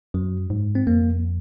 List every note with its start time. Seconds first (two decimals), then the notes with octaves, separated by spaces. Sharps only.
0.14 F#2 F#3
0.50 G#2
0.75 C4
0.87 F2 A#3